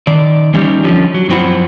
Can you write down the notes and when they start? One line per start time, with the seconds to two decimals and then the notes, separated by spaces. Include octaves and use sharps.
0.07 D#3 D5
0.54 E3 G3 C#4 D#4 G4
0.84 D3 F3 C#4
1.14 F#3
1.29 F#2 F3 C4 E4 F#5